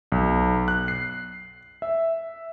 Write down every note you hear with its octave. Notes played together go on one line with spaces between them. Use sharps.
B1
F#6
C7
E5